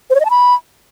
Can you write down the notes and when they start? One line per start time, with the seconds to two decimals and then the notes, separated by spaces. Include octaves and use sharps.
0.10 C5
0.15 C#5
0.20 D#5
0.25 A5
0.30 B5